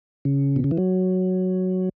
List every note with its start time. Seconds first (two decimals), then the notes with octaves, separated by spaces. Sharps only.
0.25 C#3
0.56 B2
0.64 C#3
0.71 E3
0.78 F#3